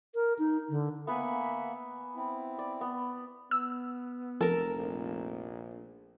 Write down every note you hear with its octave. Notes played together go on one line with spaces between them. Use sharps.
A#4
D#4
D3
A#3 B3 B4 E5 F#5 G#5
C4 E4
D5
B3
B3 E6
F1 F3 A4 A#4
A#1